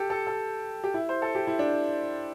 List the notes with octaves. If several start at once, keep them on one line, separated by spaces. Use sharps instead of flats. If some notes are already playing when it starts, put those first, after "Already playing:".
Already playing: G4 A4
A4
A4
G4
E4
C5
A4
G4
E4
D4